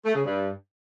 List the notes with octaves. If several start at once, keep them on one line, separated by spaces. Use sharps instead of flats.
A3
C#3
G2